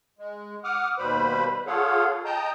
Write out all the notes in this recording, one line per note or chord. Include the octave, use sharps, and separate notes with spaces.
G#3
F#5 D6 D#6 F6
D#2 B2 G3 B4 C5 B5
F4 G#4 A4 C#5 F5 F#5
D#5 G5 A5 A#5 D#6 G6